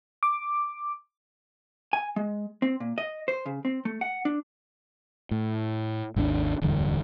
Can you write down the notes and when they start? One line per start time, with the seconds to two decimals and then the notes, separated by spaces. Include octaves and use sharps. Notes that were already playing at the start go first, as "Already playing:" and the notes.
0.23 D6
1.93 G#5
2.16 G#3
2.62 C4
2.80 A#2
2.98 D#5
3.28 C5
3.46 C#3
3.65 C4
3.85 A3
4.01 F#5
4.25 D4
5.31 A2
6.16 G#1 D#2 D3 D4
6.62 D1 E2 G2 D3